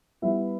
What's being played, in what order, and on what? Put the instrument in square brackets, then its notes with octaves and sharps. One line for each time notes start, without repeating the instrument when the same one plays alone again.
[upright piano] G3 B3 E4 B4 E5